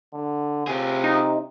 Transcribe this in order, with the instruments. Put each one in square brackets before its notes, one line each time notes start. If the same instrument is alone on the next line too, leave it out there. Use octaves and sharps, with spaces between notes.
[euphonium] D3
[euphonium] C3 [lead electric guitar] F4 G#4
[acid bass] D#4